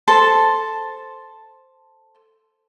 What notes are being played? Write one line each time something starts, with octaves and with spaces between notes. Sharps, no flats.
A4 C5 A5